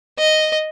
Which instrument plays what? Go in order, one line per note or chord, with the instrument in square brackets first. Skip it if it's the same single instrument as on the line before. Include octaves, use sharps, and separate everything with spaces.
[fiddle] D#5